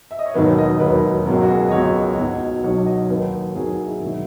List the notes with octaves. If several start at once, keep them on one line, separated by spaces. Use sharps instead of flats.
E5
D#5
C#5
E1 D#2 D#3 F#3 B4
D#5
E1 D#2 D#3 F#3 B4
C#2 B2 F#3 A#4
F#4
G#4
D#5
C#2 B2 F#3 C#5
B1 B2 F#3
B1 B2 F#3 C#5
D#5
D#2 D#3 F#3 B4
D#2 D#3 F#3 G#4
G#4
E4
E1 D#3 F#3 E4